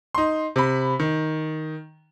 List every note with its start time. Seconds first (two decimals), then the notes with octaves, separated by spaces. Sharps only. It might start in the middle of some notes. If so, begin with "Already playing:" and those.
0.15 D#4 C6
0.56 C3 B5
1.00 D#3